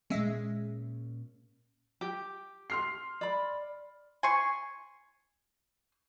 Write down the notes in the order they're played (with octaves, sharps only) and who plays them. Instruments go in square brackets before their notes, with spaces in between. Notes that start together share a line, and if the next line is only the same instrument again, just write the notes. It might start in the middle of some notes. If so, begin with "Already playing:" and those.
[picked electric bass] A#2 C#4 [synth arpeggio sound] G#3 E5
[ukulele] G4
[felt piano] C6 F6 C7
[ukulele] D5 B5
[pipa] G#5 C6 C#6